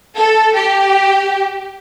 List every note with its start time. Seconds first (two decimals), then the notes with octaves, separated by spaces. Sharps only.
0.16 A4
0.55 G4